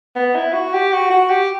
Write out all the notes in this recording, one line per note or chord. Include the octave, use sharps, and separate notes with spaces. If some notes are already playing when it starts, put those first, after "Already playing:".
B3
E4
F#4
G4
F#4
F#4
G4